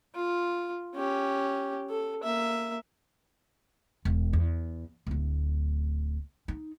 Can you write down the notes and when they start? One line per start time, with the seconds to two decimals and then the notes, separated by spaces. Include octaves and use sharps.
0.15 F4
0.95 C#4 G4
1.90 A4
2.23 A#3 E5
4.05 E1
4.33 E2
5.07 D1 D2
6.48 D#4